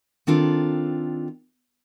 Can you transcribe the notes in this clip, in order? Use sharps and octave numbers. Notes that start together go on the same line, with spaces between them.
D#3 C4 D4 F4 A4